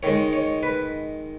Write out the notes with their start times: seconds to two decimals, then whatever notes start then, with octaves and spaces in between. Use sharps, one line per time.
0.03 D#3 G#3 C#5
0.33 C#5
0.63 B4